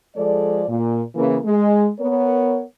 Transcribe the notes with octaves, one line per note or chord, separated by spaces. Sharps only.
F3 G#3 A4 D5
A#2
C#3 E3 A#3
G#3
B3 A#4 C#5